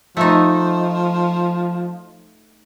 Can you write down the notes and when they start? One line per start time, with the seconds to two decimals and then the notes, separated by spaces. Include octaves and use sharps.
0.17 F3 A3 D#4